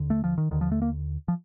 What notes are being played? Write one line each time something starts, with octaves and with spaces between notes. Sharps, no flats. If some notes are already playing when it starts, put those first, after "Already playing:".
Already playing: D#2 D3
A3
F3
D#3
D#2 D3 D#3
F3
A3
A#3
F3